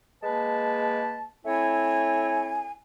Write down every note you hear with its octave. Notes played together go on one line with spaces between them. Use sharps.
G#3 A#3 B4 A5
A3 C4 E4 C#5 G#5